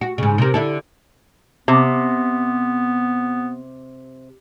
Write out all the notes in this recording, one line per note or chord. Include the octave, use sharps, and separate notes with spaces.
F#4
G#2 C#3
C3 A#4
D3 E4 A4
C3 B3